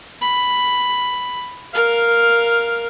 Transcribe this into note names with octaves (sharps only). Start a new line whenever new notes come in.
B5
A#4 F5